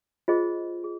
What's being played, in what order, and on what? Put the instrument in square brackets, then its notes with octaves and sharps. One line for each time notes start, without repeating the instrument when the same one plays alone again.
[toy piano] F4 G#4 C5 D#5
G#4